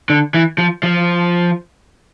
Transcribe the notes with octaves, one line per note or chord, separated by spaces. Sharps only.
D3
E3
F3
F3